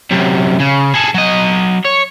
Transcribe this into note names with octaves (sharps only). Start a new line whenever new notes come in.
F#2 C3
C#3
G#4 A4
F#3 D#5
C#5